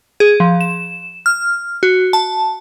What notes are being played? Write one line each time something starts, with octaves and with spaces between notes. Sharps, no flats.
G#4
F3
E7
F6
F#4
A5